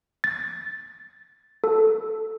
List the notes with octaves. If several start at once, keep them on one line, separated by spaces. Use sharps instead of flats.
A6
A4